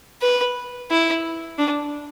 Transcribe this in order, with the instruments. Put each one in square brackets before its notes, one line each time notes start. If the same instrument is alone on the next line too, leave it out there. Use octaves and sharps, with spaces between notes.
[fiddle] B4
E4
D4